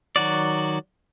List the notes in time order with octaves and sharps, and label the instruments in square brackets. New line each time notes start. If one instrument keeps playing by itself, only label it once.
[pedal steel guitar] D#3 F#3 F#4 D5